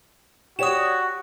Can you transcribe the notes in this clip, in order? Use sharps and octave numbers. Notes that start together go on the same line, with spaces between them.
F#4 G4 C#5 D5 F#5 D#6 E7